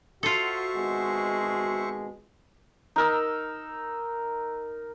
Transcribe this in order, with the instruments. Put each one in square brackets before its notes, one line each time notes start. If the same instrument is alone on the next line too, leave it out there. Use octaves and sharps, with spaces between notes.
[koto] F4 A4 [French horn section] F#4 [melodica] C5 E5 C#6
[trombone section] G#1 B2 G#3
[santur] D#4 A#4 E6